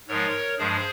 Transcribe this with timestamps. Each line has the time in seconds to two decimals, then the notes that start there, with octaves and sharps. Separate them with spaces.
0.08 G#2 F3 G#3 A#4 C#5
0.58 G2 F3 G#3 G#4 C5